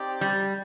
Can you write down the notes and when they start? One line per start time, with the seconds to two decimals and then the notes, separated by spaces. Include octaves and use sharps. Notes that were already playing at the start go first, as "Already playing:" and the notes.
Already playing: C4 D#4 G4 D5 G5
0.21 G3